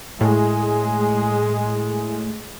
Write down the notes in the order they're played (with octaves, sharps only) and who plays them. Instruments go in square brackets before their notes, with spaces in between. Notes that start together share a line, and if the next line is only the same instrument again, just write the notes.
[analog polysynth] A2 [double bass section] G#3